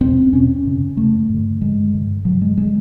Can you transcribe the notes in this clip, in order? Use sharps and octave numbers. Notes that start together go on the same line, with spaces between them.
E2 B2 C4
E2 B2 C#4
F#2 C#3
F#2 C#3 A3
G2 D3
G2 D3 G#3
G2 D3
G2 D3 F#3
G#3
D3 G#3